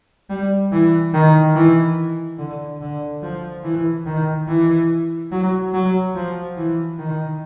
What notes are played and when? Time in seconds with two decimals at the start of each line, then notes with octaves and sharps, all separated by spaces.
0.30 G3
0.72 E3
1.13 D#3
1.55 E3
2.38 D3
2.81 D3
3.22 F3
3.64 E3
4.06 D#3
4.48 E3
5.31 F#3
5.73 F#3
6.15 F3
6.57 E3
6.98 D#3